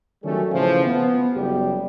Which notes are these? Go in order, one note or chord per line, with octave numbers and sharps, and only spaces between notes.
D#3 F#3 G3 A3 C#4 A4
A2 C#3 E3 F3
B3
F#1 G3 G4